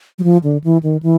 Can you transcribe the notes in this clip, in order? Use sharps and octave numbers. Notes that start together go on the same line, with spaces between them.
F#3
F3
D3
E3
D#3
E3